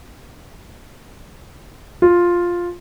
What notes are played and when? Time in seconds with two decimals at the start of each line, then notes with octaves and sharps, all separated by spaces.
2.02 F4